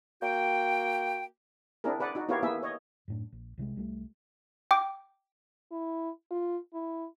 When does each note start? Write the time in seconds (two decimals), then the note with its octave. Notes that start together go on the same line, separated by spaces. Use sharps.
0.22 A#3 F#4 G5
1.84 C4 D4 E4 G#4 A#4
2.00 G#4 B4 D5 F#5
2.15 D#4 F#4
2.29 B3 E4 F4 G4 A#4 C#5
2.43 A#3 B3 E4 G#4 E5
2.63 C#5 D#5
3.08 F#2 A2 D4
3.32 A#1
3.58 C2 C3 G3 G#3
3.76 C2 G3 A3
4.71 G5 D6
5.71 E4
6.31 F4
6.73 E4